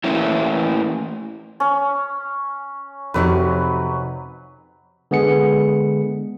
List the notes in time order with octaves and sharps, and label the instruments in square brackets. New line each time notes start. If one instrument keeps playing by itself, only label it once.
[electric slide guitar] E3 A3 A#3 C#4 E4
[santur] C#4
[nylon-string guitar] F2 C3 D#4 [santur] F#3 B4
[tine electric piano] D3 G#3 B3 G#4 C#7